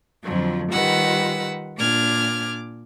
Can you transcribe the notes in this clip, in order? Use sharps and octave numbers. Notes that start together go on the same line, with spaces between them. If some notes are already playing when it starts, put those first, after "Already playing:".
F2 D3 F3 F#3
D#3 G3 F4 B4 F#5 E6
A#2 D4 D6 F6 G#6